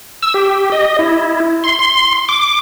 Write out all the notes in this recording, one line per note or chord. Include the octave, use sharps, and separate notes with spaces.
E6
G4
D#5
E4
C6
C6
D6